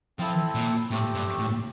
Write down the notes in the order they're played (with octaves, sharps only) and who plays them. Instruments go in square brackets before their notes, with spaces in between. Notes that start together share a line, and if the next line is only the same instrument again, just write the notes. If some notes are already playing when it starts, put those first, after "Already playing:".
[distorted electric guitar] F3 [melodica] C4 E4 A4
[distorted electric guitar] A#2
[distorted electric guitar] A2 [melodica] A3 C4 G4
[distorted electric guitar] G2
A2